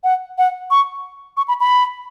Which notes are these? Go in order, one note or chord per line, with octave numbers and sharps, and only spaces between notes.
F#5
F#5
C#6
C#6
B5
B5